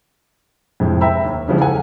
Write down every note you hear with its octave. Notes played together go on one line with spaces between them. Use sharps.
F2 A2 C3 G#3
E5 G5 A#5 B5 E6
D#2
G#2 C#3 E3 F3 G3
A4 F#5 G#5